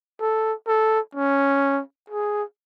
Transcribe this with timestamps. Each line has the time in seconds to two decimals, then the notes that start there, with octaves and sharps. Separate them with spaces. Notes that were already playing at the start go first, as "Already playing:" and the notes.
0.20 A4
0.67 A4
1.15 C#4
2.10 G#4